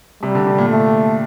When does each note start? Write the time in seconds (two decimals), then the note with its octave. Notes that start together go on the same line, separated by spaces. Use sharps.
0.22 C3 G3
0.35 D3
0.47 D3
0.58 A#2
0.70 A3